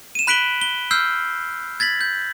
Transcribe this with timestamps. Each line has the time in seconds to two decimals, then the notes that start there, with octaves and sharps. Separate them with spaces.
0.15 D#7 E7
0.27 B5 F#6 B6 D7 F#7 G7
0.61 G7
0.91 E6 F6 G6 C7
1.80 G#6 A6 B6 F#7
2.01 G6